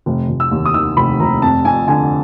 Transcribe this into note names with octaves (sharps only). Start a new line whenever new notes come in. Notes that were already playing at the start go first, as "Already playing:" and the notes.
F1
F1
E6
D#2
D#6
D#3 E6
F1 B5
F1 A#5
F2 A5
F2 G#5
D3 G#5